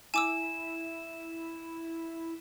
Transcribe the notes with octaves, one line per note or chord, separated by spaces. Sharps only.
E4 G#5 D6 E6 E7